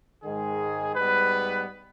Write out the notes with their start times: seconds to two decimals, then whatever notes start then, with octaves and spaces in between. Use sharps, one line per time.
0.23 G#2 D#3 G#3 G#4
0.96 G#2 G3 B3 B4